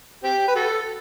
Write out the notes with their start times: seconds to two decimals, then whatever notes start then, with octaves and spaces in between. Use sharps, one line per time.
0.24 C4 G4
0.48 B4
0.56 F#4 A4